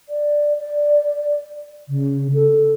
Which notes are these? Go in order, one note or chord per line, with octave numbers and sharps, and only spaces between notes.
D5
D5
C#3
A4